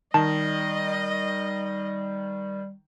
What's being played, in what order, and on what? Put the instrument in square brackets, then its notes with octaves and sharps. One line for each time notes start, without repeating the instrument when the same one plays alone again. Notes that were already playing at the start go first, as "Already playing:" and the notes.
[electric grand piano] D#3 [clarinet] G3 [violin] D#5 [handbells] A5